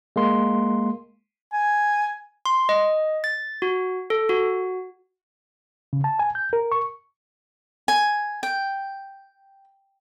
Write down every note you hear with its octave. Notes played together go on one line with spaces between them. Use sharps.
G#3 A#3 C6
G#5
C6
D#5
A6
F#4
A4
F#4
C#3
A5
G#5
G6
A#4
C#6
G#5
G5